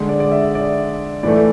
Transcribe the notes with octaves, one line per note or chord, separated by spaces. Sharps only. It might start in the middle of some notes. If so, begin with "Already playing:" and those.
Already playing: D3 G#3
D5
D5
E5
D5
A2 E3 A3 D5